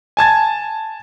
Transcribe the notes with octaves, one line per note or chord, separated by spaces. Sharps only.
G#5 A5 G#6 A6